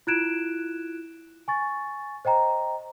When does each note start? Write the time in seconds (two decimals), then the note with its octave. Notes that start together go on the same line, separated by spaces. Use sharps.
0.07 E4 F4 F#6 G#6 D7 E7
1.48 G#5 C#6 A6
2.25 C5 D#5 G5 A#5